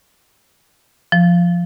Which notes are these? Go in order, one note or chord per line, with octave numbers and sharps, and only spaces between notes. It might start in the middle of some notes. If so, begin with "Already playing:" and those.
F3